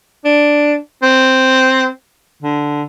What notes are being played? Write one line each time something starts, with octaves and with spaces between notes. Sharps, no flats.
D4
C4
D3